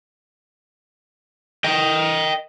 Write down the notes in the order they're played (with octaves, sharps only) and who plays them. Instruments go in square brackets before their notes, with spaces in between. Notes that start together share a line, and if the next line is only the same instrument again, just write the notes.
[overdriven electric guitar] D#5 G5